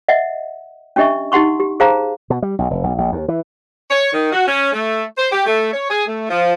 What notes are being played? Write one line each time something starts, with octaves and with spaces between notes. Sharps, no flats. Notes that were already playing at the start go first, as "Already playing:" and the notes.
D#5 E5 F#5
C#4 D4 G4 D#5 E5 C#6
D#4 G4 F#5 C6 C#6
G4
G#4 C5 F5 A5 A#5
B2
G3
B1
F1
B1
A#1
D#2
E3
C#5
D#3
F#4
C#4
A3
C5
G4
A3
C#5
G#4
A3
F3